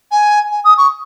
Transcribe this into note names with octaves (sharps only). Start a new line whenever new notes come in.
G#5
G#5
D#6
C#6